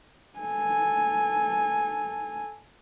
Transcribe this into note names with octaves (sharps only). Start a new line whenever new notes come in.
A4 G#5